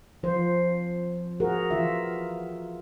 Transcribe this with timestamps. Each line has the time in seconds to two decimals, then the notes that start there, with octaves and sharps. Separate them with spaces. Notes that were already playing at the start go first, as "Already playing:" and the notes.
0.23 F3 C5
1.40 F#4 G#4 A#4
1.71 E3 F4 E5